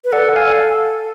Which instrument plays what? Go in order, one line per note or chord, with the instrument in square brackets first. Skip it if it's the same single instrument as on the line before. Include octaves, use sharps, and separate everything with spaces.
[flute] B4
[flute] A4 [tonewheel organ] D5 F#5
[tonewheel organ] F5 G#5